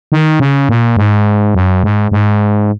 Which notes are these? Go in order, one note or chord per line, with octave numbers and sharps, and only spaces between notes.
D#3
C#3
A#2
G#2
F#2
G#2
G#2